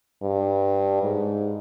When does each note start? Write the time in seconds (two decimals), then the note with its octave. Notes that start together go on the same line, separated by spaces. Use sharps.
0.23 G2
1.03 G#2